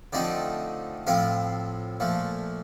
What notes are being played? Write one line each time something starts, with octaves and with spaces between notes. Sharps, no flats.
D3 F3 A3 C4 D#4 D5
A2 F3 C4 F4 F5
A#2 F3 A3